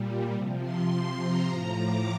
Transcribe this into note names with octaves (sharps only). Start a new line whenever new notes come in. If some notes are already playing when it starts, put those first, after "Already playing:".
Already playing: A#2 G3
C3 F3
C6
C3 F3
A#5
A2 F3
D6